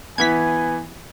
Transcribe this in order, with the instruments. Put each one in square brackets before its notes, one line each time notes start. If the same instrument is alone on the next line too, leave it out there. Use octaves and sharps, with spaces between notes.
[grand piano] E3 B3 [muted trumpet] G#5 [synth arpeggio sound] G#6 B6